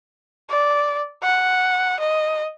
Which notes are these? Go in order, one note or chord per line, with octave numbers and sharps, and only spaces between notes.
D5
F#5
D#5